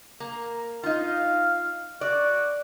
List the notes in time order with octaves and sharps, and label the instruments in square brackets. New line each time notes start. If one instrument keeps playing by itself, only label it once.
[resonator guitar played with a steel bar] A#3
[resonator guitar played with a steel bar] D#4 F4 [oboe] F5
[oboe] F#4 [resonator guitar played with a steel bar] D5